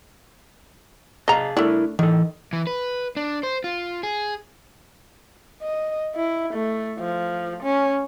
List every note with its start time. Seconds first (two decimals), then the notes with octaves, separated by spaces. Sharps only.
1.28 G#4 D#5 F5 A5 A#5
1.57 A3 D4 E4 A#4
1.99 D#3 E3 A4
2.53 E3
2.67 B4
3.17 D4
3.43 C5
3.64 F4
4.03 G#4
5.62 D#5
6.15 E4
6.53 A3
6.99 F3
7.63 C#4